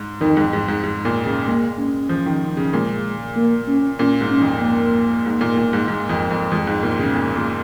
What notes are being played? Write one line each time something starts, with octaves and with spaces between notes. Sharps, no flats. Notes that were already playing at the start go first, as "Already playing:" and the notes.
Already playing: G#2
F2 D#3
G#2
G#2
G#2
G#2
A#2
C#3
G#3 A#3
C#4
F3
D#3
C#3
A#2 G#3
A#3
C#4
A#2 C#4
G#2
C#4
F2
A#3
G#2
A#2
A#2
G#2
G#2
F2
F2
F2 G#3
G#2
A#2
C#3
A#2
A#2